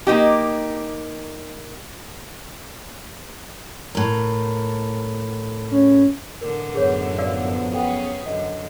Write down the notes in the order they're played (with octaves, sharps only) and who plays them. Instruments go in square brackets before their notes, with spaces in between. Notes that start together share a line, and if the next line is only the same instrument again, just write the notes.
[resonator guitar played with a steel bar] A#3 D#4 G4
[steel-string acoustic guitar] A2 A#4
[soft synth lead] C#4
[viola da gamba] A2 D3 E3 [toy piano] A#4
[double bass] F#2 [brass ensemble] B3 [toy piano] G#4 C#5
[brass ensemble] F3 F#3 B3 [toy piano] D5 F5 E6
[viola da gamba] C#4 G#4 B4 [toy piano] A4 F#5 G5
[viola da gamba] F#2 D3 [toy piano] D#5